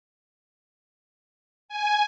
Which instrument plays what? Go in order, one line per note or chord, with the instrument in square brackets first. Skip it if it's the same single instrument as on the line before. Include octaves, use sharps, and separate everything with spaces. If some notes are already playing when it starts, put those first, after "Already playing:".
[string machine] G#5